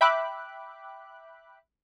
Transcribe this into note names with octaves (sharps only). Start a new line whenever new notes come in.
E5 G5 B5 D6 F#6